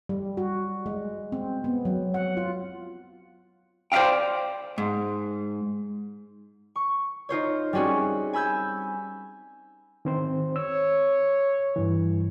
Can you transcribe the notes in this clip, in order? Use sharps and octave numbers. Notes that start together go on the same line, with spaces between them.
G3
F#4
G#3
C4
B3
F#3
F#5
F4
C5 D5 E5 F5 G5
G#2
C#6
D#4 F4 C5 C#5
G3 C4 C#4 F#4 G#4
G#5 B5 E6 G6 G#6
D#3 C4 C5
C#5 E6
G2 E3